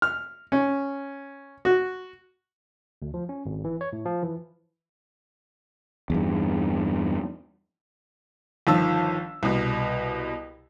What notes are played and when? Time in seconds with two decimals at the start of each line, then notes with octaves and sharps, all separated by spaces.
0.02 F6
0.52 C#4
1.65 F#4
3.02 D2
3.14 F3
3.29 C#4
3.46 G#1
3.64 E3
3.81 C#5
3.93 A2
4.05 F3
4.23 E3
6.10 E2 G2
8.67 G1 D#3 F3 A5 E6
9.43 C2 B2